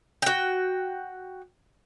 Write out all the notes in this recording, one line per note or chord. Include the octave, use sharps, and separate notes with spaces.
F#4 G5